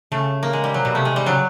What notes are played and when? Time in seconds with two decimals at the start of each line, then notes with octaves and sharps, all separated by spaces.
0.12 C#3 A3
0.43 A#3
0.53 G#3
0.64 G3
0.74 C3 F#3
0.85 B2 G3
0.95 C3 A3
1.05 G#3
1.16 G3
1.26 C#3 F#3